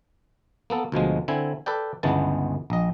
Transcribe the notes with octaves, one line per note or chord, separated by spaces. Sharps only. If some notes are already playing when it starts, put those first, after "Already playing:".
A#3 B3 A4
D2 B2 F3 G#3
D3 C4 E4 G#5
A4 B4 D5 G5
G1 C#2 E3 G#3 B3 A5
A#1 D#5